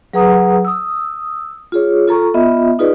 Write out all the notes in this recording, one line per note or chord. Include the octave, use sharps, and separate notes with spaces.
F#3 G#4 B4 F#5 A#5 D#6
D#6 E6
F4 G#4 C#5
F4 A4 A#5 C#6
B3 F4 D#5 E5
D#4 F4 G#4 B4 D5 D#5